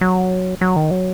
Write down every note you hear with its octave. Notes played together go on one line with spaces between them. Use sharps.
F#3
F#3
D#3
F#3